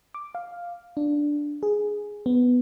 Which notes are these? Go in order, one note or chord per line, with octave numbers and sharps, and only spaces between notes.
D6
F5
D4
G#4
B3